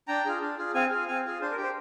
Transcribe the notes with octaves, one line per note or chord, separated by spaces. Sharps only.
D4 G5 A#5
F4 G#4
D4
F4 G#4
C4 F5 G#5
F4 G#4
C4 F5 G#5
F4 G#4
D4 C5
A#4
G4
C5